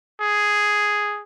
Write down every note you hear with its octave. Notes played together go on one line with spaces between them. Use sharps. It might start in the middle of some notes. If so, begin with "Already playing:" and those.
G#4